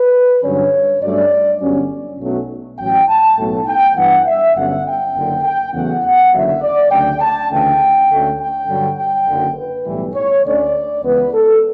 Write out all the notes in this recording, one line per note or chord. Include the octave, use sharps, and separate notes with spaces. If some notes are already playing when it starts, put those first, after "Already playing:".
Already playing: B4
G2 D3 F#3 C#4 C#5
G2 F#3 A3 C#4 D5
G1 G2 F#3 C#4
B1 B2 F#3 A3 C#4
A1 A2 F#3 G5
A5
B1 A2 F#3 A3
G5
G2 E3 B3 F#5
E5
G1 G2 D3 F#3 C#4 F#5
G5
F#1 F#2 D3
G5
E2 C#3 F#3 A3 F#5
F#5
F#1 E2 D3 F#3 E5
D5
D2 C#3 F#3 G5
A5
D2 C#3 E3 A3 G5
D2 D3 A3 C#4
G5
G2 D3 F#3
G5
F#1 F#2 D3
B4
B1 A2 E3 G3
C#5
D2 D3 A3 C#4 D5
C#2 C#3 E3 B3 B4
A4